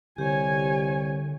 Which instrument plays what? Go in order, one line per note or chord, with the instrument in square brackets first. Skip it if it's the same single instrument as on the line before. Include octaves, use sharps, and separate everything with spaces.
[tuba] C2 [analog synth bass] D3 [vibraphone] G4 [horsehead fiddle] C#5 G#5